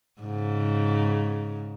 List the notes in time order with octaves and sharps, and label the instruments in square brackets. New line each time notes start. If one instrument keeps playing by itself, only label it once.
[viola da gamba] G#2 C#3